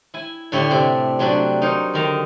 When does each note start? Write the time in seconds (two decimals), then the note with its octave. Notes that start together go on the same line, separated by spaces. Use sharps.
0.14 E4 G#5
0.52 A2 D3 A3 G4 C#5 E5
0.70 C3 D4
1.19 C3 F#3 G3 D4 F#4
1.62 D#4 A#4 C5 C#5
1.94 D3 D#3 A#5